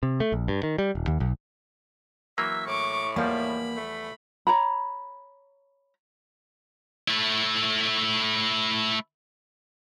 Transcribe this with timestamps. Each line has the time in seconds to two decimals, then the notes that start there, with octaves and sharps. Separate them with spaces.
0.03 C3
0.20 A3
0.32 A#1
0.48 G2
0.63 D#3
0.78 G3
0.95 D#1
1.07 D#2
1.20 B1
2.38 E3 F#3 A#3 E5
2.67 A2 C#6 D6
3.16 E2 F3 G3 A#3 B5
3.76 A3
4.47 C#5 A#5 B5
7.08 A3 E4